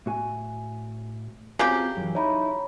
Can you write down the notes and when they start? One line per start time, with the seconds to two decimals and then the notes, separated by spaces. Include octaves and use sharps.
0.06 A2 F#4 G#5
1.59 C#3 F#3 C4 F4 G4 G#4
1.97 F#2 E3
2.15 D#4 E4 C#5 A#5 B5